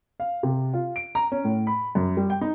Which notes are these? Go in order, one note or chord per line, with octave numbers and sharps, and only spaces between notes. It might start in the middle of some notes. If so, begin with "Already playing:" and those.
F5
C3
F4
D7
A#5
C#4
A2
B5
F#2
G3
G5
D#4